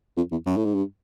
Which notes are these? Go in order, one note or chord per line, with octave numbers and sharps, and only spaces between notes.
F2
E2
F#2
A2
G#2
G2